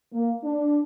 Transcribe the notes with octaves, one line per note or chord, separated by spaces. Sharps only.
A#3
D4